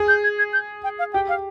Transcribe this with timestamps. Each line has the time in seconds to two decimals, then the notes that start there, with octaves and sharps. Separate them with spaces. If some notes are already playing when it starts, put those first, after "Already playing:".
Already playing: G#4
0.08 G6
0.24 G#6
0.39 G#6
0.53 G6
0.84 G5
0.99 F5
1.13 G4 G5
1.29 F5